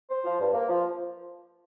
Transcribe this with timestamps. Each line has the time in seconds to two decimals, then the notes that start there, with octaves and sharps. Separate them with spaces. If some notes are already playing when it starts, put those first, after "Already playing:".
0.10 C5
0.25 F3
0.40 G2
0.54 A#3
0.69 F3